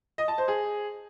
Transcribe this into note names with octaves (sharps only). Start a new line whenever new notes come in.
D#5
A5
C5
G#4